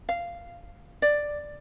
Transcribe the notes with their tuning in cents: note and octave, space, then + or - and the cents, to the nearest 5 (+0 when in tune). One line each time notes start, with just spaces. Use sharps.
F5 -10
D5 +5